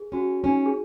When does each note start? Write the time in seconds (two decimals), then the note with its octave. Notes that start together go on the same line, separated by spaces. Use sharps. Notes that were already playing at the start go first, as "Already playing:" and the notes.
Already playing: G#4
0.12 C#4 F#4
0.44 C#4 D#4
0.66 G#4